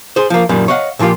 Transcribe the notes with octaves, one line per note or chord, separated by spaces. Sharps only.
G#4 C5
F3 A#3
F#2 A#2 D#3 G3
C#5 D#5 F5 F#5
A#2 F3 A#3 F4 G4